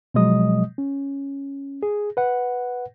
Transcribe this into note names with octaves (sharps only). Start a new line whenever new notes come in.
B2 F3 F#3 G#3 D#5 D#6
C#4
G#4
B4 F#5